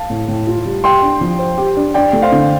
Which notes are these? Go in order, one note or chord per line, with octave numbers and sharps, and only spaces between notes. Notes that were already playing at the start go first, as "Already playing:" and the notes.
Already playing: F5 A5
A2
A2
F4
G3
G4 G5 C6
D4
F3
C5
G4
D4
D4 D5 G5
A3
C5 F5
D3